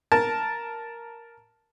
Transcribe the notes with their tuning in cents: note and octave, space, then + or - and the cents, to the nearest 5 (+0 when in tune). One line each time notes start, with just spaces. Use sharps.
A#4 +0 A5 +0